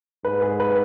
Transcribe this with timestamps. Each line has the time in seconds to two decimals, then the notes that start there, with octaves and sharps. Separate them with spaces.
0.25 G#2 B4
0.42 G#4
0.60 B4